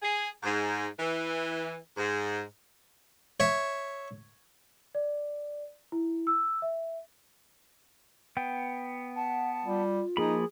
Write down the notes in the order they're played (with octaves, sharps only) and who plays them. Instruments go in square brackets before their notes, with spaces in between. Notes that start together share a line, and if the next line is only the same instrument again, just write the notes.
[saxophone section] G#4
G#2
E3
G#2
[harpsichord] C#5 E5
[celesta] D5
E4
E6
E5
[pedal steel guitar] B3 G5
[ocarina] F#5 [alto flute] A5
[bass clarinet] G3 [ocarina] F4
[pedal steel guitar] F3 A#3 B5 [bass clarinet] D#4 [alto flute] G#4